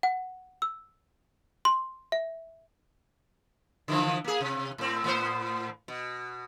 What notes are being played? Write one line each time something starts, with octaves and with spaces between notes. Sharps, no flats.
F#5
E6
C6
E5
D3 E3 F3
A#3 G#4
C3
A2 C4
A2 B3 C5
B2